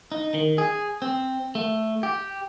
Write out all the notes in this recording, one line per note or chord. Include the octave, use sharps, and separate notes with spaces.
D#4
D#3
G#4
C4
A3
G4